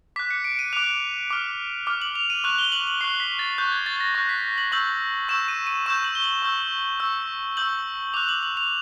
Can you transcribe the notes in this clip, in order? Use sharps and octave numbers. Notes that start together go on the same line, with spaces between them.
D6 F#6 B6
C#7
D7
D#7
D6 F#6 F7
D6 F6
D6 F6
F#7
F7
D#7
C#6 F#6 F7
G7
F#7
F#7
C#6 F#6 C7
B6
A6
C#6 F#6 G6
G#6
A6
A6
A#6
C#6 F#6 A#6
B6
F#7
C#6 E6 G6 F#7
C#6 E6 G6 E7
D#7
D#7
C#6 E6 G6 E7
F#7
G7
F#7
C#6 E6 G6
C#6 E6 G6
C#6 E6 G6 F#7
D6 F#6 F7
F#7
F#7
F7